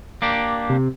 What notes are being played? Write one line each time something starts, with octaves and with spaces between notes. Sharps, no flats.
A#3 D4 G4
C3